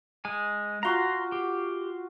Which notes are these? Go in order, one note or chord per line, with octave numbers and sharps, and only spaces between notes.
G#3 G#5
F4 F#4 F5 A#5 C6
G4